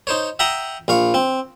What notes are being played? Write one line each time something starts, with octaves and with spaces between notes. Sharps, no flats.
D#4 C5 C#5
E5 F#5 G5 A#5 D#6
A#1 F5 C#6
C4